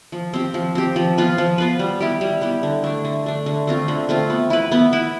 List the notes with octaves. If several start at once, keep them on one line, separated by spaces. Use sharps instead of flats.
F3
C4 G4
F3
C4 G4
F3
B3 F4 B4
F3
B3 F4 B4
G3
B3 E4 G4
G3
B3 E4 G4
D3
A3 D4
D3
A3 D4
D3
A3 C4 F4
D3
A3 C4 F4
B3
E4 B4
B3
E4 B4